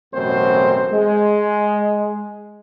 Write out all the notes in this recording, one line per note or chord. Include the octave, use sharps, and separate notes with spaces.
A1 F#2 B2 C4 C5
G#3